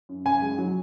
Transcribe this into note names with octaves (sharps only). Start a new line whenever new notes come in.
F#2
F#2 G#5
G#3
F#3